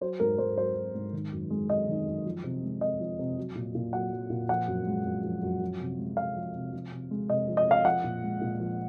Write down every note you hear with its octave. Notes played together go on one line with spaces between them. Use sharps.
F#3 C5
G#2 A#4
G#2 C5
F#3 C5
F#3
G#2
D#3
F#2
G#3
F#2 D#5
D#3
F#2
F3
C3
G#3
C3 D#5
F3
C3
F#3
A#2
A#2
F#3 F#5
F#3
A#2
F3 F#5
F#2
G#3
F#2
F3
F#2
F3
C3
G#3
C3 F5
F3
C3
F3
C3
G#3
C3 D#5
F3
D#5
C3 F5
F3 F#5
A#2
G#3
A#2
F3